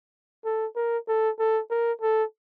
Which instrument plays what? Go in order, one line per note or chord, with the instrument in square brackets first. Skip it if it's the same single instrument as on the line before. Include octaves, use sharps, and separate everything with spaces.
[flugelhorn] A4
A#4
A4
A4
A#4
A4